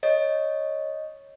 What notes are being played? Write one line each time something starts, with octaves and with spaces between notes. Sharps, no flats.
C#5 D#5